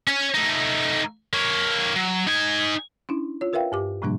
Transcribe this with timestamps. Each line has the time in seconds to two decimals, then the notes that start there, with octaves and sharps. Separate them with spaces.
0.07 C#4 C#5
0.35 A3 D#4
1.33 A#3 C#5
1.95 F#3
2.27 D#4 G#5
3.09 C#4 D4 E4
3.41 F4 C#5
3.53 F4 A#4 B4 E5 F5 G5
3.72 G2 G4 D6
4.02 A2 C3 F3 G3 A#3 D4